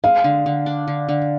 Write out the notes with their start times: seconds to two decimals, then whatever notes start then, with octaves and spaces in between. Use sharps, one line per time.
0.04 G#3 F5
0.24 D3
0.46 D3
0.66 D4
0.88 D3
1.09 D3